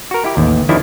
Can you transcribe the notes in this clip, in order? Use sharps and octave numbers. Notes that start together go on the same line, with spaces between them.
F#4 A#4
E4 G4
A1 D#2
D#3 F3 D4 E4 G4